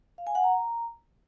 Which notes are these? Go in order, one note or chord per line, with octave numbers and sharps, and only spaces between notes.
F5
G#5
F#5
A#5